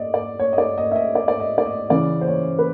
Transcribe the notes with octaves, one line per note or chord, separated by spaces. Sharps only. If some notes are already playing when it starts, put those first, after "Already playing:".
Already playing: D5 D#5
D5
C#5
D#5
D5
D#5
E5
D#5
D5
D5
D#5
D5
D#5
C#3 E3 D5
C5
C#5
B4